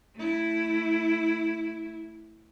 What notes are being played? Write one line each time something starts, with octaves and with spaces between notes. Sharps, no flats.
A3 E4